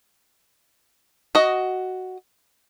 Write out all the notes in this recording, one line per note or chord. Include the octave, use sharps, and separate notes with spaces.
F#4 D#5